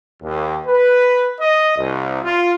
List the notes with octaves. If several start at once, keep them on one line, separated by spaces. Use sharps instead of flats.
D#2
B4
D#5
C2
F4